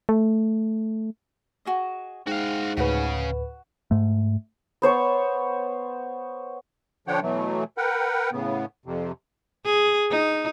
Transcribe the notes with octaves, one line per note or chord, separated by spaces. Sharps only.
A3
F#4 G#4 D#5
G#2 F#4 F5 G5
D2 A2 C#3 C#4 F#4 B4 F#5
G#2 A3
B3 C5 C#5 C#6
D3 F3 D4 C#5 F#5 G5
B2 E3 F#3 A3
A#4 B4 F#5 G5
A2 C#3 B3
F2 C3
G#4
D#4